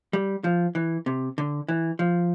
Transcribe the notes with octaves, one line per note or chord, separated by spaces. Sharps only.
G3
F3
E3
C3
D3
E3
F3